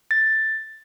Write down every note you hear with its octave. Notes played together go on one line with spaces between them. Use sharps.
A6